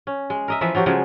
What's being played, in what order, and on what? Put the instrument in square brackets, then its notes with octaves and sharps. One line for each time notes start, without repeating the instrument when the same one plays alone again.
[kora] C#4
G#3
A#4 D#5 E5
E3 F3 B4 E5
F3 F#3 F#4 G4
C#3 F3 F#3 G#3